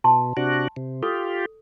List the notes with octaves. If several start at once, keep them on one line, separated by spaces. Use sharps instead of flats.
B2 A5 C6
C3 D4 F#4
C3
F4 G4 A4